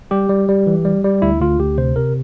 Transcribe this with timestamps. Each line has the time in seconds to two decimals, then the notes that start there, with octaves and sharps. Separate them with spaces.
0.11 G3 G4
0.29 G3
0.48 G3
0.67 E3
0.85 G3
1.04 G3
1.22 D2 E4
1.41 D2 F4
1.60 D2 G4
1.78 C3 C5
1.96 C3 A#4